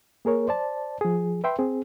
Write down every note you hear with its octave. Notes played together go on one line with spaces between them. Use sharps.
A#3 G#4 A#4 C#5
C5 D5 A5
F3 G#4
B4 E5 G5 C6
C4 G#4